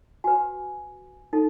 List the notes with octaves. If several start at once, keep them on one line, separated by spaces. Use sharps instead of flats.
F#4 B4 G#5
D#4 A4